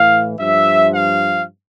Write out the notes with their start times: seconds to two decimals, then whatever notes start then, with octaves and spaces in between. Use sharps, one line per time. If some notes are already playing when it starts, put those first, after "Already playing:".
Already playing: A2 E3 F5
0.40 G2 F3 E5
0.94 F5